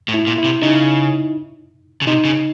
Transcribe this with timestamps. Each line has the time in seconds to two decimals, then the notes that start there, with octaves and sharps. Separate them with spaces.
0.08 A2
0.14 E4
0.27 A#2
0.38 E4
0.44 C3
0.62 C#3 D#4
2.01 C#3
2.07 C3 D#4
2.25 C#3